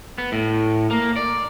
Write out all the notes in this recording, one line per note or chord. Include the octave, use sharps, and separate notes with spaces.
B3
A2
A#3
D5